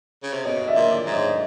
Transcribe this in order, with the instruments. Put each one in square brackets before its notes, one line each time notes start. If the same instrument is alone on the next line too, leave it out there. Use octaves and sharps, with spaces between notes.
[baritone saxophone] C#3
C3
[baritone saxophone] B2 [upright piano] C#5 D#5
[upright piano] D#5
D5 E5
[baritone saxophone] A#2
[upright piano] D5 E5
[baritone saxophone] G#2
[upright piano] C#5 D#5